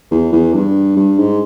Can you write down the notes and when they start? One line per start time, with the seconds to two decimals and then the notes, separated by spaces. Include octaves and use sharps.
0.11 E2
0.32 E2
0.53 G2
0.96 G2
1.19 G#2